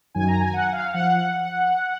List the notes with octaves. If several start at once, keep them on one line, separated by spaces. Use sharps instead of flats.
F#2 D#3 F#3 G#5
A#5
G#5
F#5
F5
F3 F#5